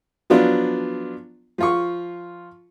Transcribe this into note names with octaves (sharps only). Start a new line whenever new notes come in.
F3 F#3 B3 D4 F4
F3 F4 C#6